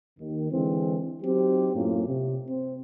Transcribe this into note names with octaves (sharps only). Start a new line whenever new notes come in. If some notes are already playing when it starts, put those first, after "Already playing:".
D#2 D#3
D3 E3 G#3 C4
F#3 C4 D#4 G4
F#2 A2 A#3 C#4 F4
C3
C4